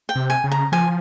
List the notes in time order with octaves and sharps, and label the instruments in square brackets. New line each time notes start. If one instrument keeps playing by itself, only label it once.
[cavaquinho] G5
[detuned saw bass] C3
[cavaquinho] G#5
[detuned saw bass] C#3
[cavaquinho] A#5
[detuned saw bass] F3 [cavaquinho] G#5